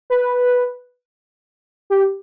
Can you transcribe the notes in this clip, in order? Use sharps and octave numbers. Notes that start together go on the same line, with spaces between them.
B4
G4